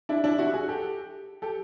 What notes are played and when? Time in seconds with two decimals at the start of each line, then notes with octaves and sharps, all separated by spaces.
0.09 D4 E4
0.24 D4 E4
0.38 E4 F#4
0.53 F#4 G#4
0.68 G4 A4
1.42 G4 A4